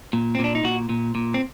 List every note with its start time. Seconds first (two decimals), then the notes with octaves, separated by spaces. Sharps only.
0.13 A#2
0.35 C4
0.39 A#2
0.44 D4
0.55 D#4
0.64 A#2 F#4
0.89 A#2
1.15 A#2
1.34 C4